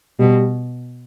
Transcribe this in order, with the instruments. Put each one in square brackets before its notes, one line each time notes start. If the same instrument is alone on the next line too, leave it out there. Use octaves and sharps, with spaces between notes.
[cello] B2 [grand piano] G3